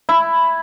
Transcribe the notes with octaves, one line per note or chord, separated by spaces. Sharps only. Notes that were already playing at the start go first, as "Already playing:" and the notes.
E4